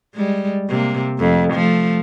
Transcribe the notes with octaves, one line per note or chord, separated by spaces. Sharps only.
G3 G#3
C3 A#3
F2 A3
F3 A3